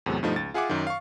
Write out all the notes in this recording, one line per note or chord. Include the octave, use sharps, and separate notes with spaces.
E2 A2 C3 F#3 A3
G2 B2 F3 A3 D#4
C#2 A6
F4 G#4 E5 F#5 G#5 D6
F#2 D#3
F5 C#6